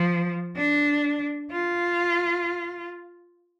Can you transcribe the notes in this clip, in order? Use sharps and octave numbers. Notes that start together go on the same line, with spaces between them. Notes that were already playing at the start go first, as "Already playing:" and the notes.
Already playing: F3
D4
F4